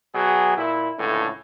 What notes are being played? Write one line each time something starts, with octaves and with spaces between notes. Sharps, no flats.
B2 F#3 G#4
A#2 E4
C#2 A2 D3 E3